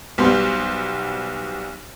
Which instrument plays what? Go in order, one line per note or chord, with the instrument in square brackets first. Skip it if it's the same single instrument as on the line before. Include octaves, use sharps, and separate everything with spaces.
[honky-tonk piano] B1 G3 B3 C5 C6